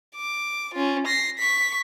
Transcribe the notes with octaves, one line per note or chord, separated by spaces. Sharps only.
D6
C#4 F4
A#6 C7
C#6 B6